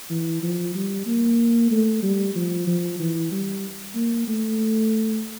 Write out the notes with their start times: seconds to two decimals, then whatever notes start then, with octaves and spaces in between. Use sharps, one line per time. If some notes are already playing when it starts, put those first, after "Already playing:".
0.10 E3
0.42 F3
0.75 G3
1.06 A#3
1.71 A3
2.03 G3
2.35 F3
2.67 F3
3.00 E3
3.32 G3
3.95 A#3
4.28 A3